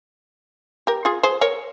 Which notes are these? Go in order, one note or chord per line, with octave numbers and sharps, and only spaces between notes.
G4 A#4
F4 G#4
G#4 C5
A#4 C#5